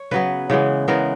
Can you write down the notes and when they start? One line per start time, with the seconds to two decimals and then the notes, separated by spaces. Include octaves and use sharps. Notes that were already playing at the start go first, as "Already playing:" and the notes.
Already playing: C#5
0.11 C#3 F#3 B3 B4
0.50 C#3 E3 G#3 B3
0.88 C#3 E3 G#3 B3 A#4